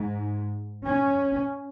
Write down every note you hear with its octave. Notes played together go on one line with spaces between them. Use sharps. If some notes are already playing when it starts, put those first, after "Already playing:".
Already playing: G#2
C#4